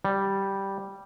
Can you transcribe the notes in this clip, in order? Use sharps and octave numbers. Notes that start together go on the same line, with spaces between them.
G3